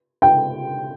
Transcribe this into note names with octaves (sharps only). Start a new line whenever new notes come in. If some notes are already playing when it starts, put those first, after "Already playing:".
G5